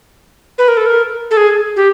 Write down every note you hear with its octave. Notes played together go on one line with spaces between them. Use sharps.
B4
A#4
A4
A#4
A4
G#4
G4